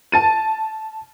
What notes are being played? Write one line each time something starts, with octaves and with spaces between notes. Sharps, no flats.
A5 A6 D#7